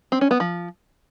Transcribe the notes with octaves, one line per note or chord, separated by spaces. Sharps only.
C4
C#4
B3
F3